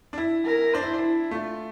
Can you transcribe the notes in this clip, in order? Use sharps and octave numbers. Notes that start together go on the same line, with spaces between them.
D4
E4
A#4
D4 C5
E4
D4
E4
A3 F4